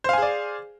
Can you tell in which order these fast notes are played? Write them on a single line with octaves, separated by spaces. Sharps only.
C5 F5 G#5 G#4 D5